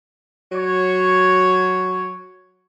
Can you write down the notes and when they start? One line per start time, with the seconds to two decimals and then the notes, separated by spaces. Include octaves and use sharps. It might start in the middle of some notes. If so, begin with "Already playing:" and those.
0.52 F#3 C#5